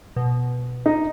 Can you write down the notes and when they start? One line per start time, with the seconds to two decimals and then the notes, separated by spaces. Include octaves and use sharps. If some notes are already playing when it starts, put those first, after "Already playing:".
0.16 B2
0.86 D#4